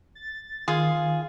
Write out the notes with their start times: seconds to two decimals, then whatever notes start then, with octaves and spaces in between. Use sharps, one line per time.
0.15 A6
0.68 D#3 F4 G#4 F5